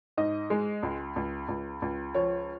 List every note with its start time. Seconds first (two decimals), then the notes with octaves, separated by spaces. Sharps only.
0.17 G#2 D#5
0.50 G#3
0.83 C#2
1.16 C#2
1.48 C#2
1.82 C#2
2.14 F3 C#5